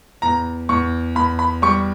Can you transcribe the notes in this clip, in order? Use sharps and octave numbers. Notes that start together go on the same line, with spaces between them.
E2 A#5
E2 C#6
E2 B5
B5
G3 C#6